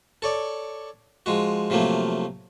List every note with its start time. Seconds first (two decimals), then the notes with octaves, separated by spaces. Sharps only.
0.22 A4 C#5 D5
1.26 F3 G#3 F#4
1.70 C3 F3 F#3 A3 A#3